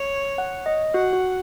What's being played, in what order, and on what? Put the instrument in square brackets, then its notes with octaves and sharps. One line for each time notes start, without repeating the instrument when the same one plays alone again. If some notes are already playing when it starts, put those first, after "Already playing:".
Already playing: [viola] C#5
[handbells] F#5
D#5
[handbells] F#4 [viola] F#5
[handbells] F#4